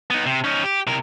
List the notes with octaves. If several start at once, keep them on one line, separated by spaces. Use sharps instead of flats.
B3 D#4
C3
C#4 D#4
G4
C3 A#4